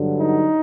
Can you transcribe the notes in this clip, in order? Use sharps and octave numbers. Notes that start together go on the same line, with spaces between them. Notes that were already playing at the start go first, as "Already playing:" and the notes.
Already playing: G2 D3 F#3
D#4